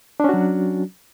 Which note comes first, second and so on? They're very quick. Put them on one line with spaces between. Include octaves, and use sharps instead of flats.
D4 C#4 F#4 F#3